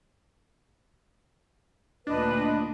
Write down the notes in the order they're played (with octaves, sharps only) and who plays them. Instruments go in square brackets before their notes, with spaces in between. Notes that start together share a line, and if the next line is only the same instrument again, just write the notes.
[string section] D2 A#2 [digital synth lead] D4 [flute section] B4 D#5